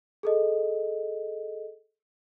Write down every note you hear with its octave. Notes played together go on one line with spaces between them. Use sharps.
G#4 A4 D#5